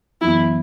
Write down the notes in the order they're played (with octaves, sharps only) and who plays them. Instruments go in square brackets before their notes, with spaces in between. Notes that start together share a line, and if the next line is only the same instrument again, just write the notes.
[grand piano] F#2 E3 B3 [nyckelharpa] E4